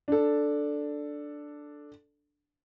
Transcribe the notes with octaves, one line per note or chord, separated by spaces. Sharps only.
D4 A4